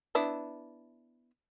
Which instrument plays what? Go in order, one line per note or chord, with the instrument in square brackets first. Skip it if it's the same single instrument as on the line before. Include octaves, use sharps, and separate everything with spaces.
[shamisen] B3 D4 E4